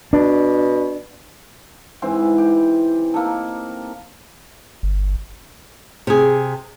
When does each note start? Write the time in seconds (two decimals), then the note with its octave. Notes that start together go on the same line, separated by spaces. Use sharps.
0.13 B2 D4
2.02 G#2 E3 C4
2.38 G4
3.14 A#3 D#4 A4
4.83 G1
6.07 C3 G#4